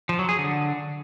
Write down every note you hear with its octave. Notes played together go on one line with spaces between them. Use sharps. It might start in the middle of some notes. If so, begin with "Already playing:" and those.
F3
F#3
G#4
D3